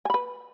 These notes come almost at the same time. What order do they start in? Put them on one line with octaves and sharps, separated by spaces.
G#5 B5 B4